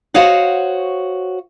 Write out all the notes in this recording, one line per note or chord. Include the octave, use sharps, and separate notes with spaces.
F#4 C5 C#5 D#5 F5 F#5